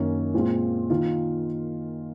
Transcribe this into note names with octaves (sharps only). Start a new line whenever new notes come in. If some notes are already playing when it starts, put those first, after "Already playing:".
Already playing: F#2 D#3 A#3 C#4
A#2 G#3 C4 F4
D#3 A#3 F4